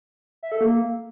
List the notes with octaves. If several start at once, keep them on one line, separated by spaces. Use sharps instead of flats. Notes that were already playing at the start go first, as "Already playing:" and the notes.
E5
A4
A#3